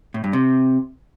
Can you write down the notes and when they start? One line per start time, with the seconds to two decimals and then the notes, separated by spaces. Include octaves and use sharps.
0.14 A2
0.24 G2
0.33 C3